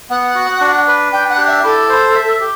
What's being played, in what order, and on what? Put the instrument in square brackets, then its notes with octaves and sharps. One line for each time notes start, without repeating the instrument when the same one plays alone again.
[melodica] B3 [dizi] F#5
[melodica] F#4
D4
B4
[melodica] D4 [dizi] G5
[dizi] F#5
[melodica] G4
[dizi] E5
[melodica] E4 [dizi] A4
[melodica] C5
E5
G4